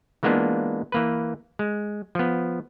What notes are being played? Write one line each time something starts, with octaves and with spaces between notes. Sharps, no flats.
E3 G#3 A#3 B3 D4 F4
E3 A#3 B4
G#3
F3 B3